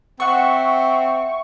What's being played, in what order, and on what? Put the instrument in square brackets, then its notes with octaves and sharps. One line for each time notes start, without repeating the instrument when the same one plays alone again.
[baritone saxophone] C4 [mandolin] E5 F#5 [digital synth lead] C#6